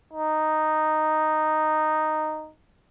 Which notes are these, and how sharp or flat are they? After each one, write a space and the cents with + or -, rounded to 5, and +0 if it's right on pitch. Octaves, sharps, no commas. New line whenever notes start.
D#4 -5